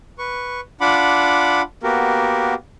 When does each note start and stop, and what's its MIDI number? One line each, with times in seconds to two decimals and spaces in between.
0.19 0.60 71
0.19 0.60 85
0.81 1.62 62
0.81 1.62 65
0.81 1.62 78
0.81 1.62 83
0.81 1.62 86
1.83 2.54 58
1.83 2.54 59
1.83 2.54 66
1.83 2.54 67
1.83 2.54 70